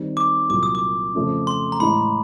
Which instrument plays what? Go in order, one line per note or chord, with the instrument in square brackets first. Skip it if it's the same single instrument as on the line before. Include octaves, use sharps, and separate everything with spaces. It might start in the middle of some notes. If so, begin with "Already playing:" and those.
Already playing: [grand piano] D#3 G3 C4
[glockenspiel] D6
[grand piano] C2 A#2 F#3 [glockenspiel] D6
[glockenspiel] D#6
D6
[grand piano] F2 C#3 F3 A3 C#4
[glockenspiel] C6
A#5
[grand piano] A2 E3 G#3 [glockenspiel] B5